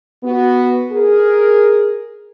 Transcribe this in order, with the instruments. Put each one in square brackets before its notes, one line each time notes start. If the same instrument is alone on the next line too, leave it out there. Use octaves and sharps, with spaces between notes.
[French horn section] B3 F#4
G#4 A#4